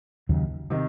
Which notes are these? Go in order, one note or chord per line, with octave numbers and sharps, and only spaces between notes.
D#2 C#3 F#3
C3 D#3